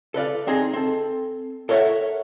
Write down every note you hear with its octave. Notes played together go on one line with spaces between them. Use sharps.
A4 B4 D5 F5
C4 D#4 G#4
C4 A4
A4 A#4 C#5 D5 E5 F#5